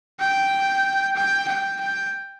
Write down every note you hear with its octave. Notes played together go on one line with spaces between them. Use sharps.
G5
G5
G5
G5